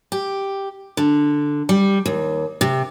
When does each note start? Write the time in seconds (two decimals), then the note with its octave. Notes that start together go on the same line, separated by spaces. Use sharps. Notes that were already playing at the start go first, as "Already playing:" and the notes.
0.12 G4
0.97 D3
1.69 G3
2.06 D#2
2.61 C3